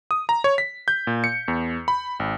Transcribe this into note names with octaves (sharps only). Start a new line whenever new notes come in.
D#6
A#5
C#5
B6
G6
A#2
C#7
E2
B5
G#1